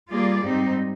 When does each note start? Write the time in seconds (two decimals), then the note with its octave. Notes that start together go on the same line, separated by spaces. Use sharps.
0.11 G3 A#3 F4 G#4 D5
0.43 G#2 G3 C4 D#4